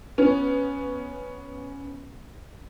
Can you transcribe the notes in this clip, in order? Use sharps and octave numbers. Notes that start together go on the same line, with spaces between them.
B3 C#4